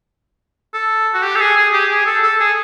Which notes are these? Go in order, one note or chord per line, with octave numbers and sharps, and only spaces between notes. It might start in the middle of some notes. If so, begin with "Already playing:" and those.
A4
F#4
G4
A4
G#4
G#4
G4
G#4
A4
A4
G#4